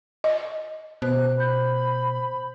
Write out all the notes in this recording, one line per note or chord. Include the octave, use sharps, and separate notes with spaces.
D#5
B2 C5 F#6
C5 B5 G6